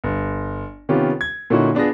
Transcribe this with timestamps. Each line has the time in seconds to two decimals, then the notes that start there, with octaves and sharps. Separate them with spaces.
0.04 G1
0.89 C3 D#3 B3 C#4 F4 G4
1.21 G#6
1.50 A#2 D3 C#4 D#4 E4 F#4
1.75 B3 D4 F4 G#4 A#6